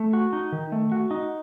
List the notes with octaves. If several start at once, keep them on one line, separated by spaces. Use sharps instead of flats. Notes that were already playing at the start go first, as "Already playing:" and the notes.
Already playing: A3
F#4
D#4
D#3
A3
F#4
D#4